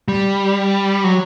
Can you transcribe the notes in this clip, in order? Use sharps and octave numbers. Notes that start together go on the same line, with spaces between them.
G3
F#3